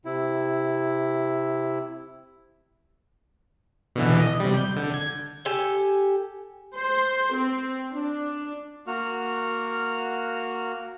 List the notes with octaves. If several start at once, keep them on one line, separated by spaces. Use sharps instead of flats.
C3 E4
B2 D3 E3
D#5
C3 G3
G6
D3
G#6
G4 A4 G#5
C5
C4
D4
A#3 F#4 F6